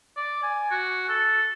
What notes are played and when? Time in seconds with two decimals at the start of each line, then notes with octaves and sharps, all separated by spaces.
0.16 D5
0.43 G#5
0.71 F#4
1.09 A4